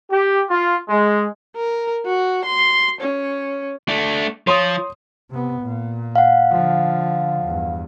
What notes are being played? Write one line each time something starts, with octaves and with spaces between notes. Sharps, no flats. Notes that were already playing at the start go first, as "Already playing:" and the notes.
G4
F4
G#3
A#4
F#4
C6
C#4
A3 D4
F3 C#5 C6 D#6
C3 B3
A#2
F5 F#5
D3 F3
E2 G2